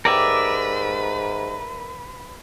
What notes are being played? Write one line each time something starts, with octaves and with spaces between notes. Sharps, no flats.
G#2 G4 A#4 B4 D5 E5